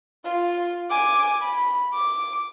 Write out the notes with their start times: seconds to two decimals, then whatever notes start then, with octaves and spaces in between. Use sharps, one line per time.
0.25 F4
0.90 G#5 D6
1.41 B5
1.94 D6